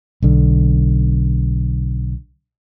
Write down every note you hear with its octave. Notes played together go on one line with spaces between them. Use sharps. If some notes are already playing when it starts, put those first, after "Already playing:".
B1 D3